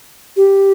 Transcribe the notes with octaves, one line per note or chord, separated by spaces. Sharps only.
G4